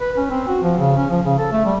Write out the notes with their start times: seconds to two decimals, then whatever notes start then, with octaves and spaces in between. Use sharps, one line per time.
0.01 B4
0.17 C#4
0.30 C4
0.48 F#4
0.63 F3
0.78 C#3
0.97 C#4
1.11 F3
1.25 C#3
1.39 A4
1.52 A3
1.65 G3